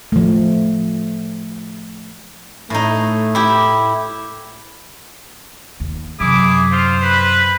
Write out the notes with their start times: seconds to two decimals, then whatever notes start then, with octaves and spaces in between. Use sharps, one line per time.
0.12 F3 A3
2.70 A2 A3 D#4
3.35 E4 G4
5.80 D#2
6.20 F#2 C3 E4 G#4 D6
6.72 F4 C5
7.02 B4